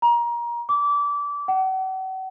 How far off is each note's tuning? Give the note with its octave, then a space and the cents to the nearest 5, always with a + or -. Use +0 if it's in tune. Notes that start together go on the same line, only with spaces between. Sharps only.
A#5 +25
D6 -25
F#5 +40